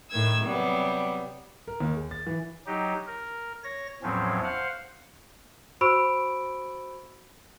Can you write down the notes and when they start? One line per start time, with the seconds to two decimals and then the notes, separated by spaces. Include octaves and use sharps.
0.11 A2 D#3 E6 G#6
0.45 C3 F#3 G3 B3
1.68 A#4
1.80 D#2
1.96 G#4
2.11 A6
2.27 E3
2.66 F#3 D#4 G4
3.07 A#4
3.64 C#5 A#6
4.03 E2 A2 F3 F#3 C4 C#4
4.44 C5 F5 F#5
5.81 F#4 C5 B5 C#6 E6 D7